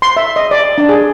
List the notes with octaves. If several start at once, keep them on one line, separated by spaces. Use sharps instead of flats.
C6
E5
D#5
D5
D4
G#4